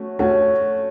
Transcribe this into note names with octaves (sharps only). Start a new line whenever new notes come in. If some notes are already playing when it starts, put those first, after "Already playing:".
Already playing: A3 C#4 F#4
A3 C#4 F#4